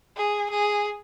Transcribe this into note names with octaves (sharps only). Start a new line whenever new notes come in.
G#4
G#4